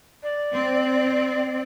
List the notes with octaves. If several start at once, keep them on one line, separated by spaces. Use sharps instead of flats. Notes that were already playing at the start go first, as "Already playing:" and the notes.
D5
C4